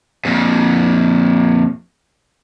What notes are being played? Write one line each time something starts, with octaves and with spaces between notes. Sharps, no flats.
F2 A#2